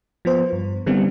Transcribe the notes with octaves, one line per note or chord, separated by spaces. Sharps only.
F3 B3 C5
G2
D3 D#3 G3 B3 C4